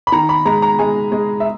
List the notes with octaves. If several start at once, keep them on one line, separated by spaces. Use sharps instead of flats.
B5
D#3 A#5
B5
G#3 A#5
A#5
G#3 G#5
G#3
E5